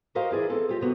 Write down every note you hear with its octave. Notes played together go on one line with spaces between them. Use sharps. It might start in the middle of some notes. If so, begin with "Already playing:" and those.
F#4 G4 A#4 C5 D#5 F5
E3 E4 G#4 D5
B3 C4 A4
F4 G4 D#5
C3 B3 F#4